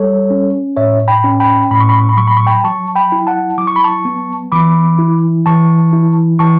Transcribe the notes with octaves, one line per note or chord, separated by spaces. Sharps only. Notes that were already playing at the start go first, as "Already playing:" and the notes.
Already playing: G3 A4 C#5
C#4
A2 C#5 E5
G5 B5
C#4
G5 B5
A2 B5
C#6
B5
C#6
B5
F#3 C#6
B5
C#6
G5 B5
F#3 A5 C#6
G5 B5
E4
F#5 A5
F#3 D6
C#6
B5
A5 C#6
B3
E3 B5 D6
E4
E3 A5 C#6
E4
E3 A5 C#6